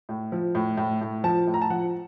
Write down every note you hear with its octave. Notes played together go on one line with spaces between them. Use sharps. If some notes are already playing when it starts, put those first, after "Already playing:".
A2
F3
A2
A2
A2
F3 A5
A2
A#5
A5
F3 F#5